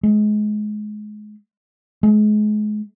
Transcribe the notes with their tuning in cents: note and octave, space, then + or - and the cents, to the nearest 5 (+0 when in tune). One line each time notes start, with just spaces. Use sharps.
G#3 +25
G#3 +35